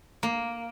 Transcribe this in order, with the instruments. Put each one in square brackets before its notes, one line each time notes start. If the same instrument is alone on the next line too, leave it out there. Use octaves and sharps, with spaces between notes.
[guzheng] A#3